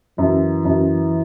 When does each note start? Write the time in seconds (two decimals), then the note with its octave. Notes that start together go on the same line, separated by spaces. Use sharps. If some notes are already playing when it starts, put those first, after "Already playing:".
0.18 F#2 E3
0.65 F#2